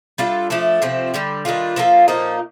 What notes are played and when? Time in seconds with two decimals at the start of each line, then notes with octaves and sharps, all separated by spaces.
0.18 G3 D4 F4 A4
0.50 F3 A3 D4 A4
0.82 C3 F3 A3 C4
1.14 D3 G3 D4
1.45 D#3 G3 D4 F4
1.76 F3 A#3 F4 A4
2.08 A#2 F3 A#3 D#4